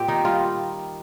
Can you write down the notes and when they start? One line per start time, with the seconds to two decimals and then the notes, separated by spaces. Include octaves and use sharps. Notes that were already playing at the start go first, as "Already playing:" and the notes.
Already playing: A#2 C4 G4
0.08 D#3 D#4
0.25 G3 F4